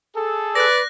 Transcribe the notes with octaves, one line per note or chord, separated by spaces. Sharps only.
G#4 A4
B4 D5 F#6 A#6